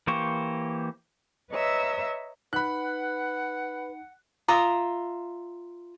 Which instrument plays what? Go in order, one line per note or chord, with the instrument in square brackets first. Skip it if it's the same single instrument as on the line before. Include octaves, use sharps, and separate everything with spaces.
[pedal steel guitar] E3 A#3 G4 C5 C#6
[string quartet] B4 C#5 D#5 E5 A#5 E6
[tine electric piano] D#4 [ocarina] B4 [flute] F#5 [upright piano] B5 F#6
[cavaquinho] F4 E5 A#5 D#6